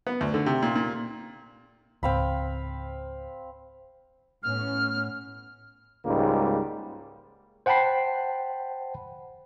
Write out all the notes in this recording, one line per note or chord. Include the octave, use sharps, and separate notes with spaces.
B3
D2
D3
C3
A#2
A#2
C#2 G#2 C4 F5 B5
A2 B3 C#4 F6
C#2 G#2 G3 A#3
C5 F#5 G5 A5 B5 C7